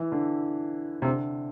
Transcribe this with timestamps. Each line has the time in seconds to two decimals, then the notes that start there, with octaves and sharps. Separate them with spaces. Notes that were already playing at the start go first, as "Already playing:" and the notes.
Already playing: E3
0.12 D3
1.02 C3
1.05 D3